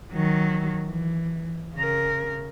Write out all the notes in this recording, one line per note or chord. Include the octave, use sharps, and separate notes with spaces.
D#3 F#3
E3
C#3 A#4